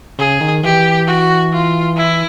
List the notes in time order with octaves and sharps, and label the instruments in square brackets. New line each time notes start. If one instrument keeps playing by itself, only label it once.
[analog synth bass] C#3 [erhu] G#4
[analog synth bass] D#3
[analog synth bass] E3 [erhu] G4
[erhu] F#4
F4
E4